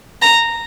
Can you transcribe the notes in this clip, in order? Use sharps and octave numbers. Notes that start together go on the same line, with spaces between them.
A#5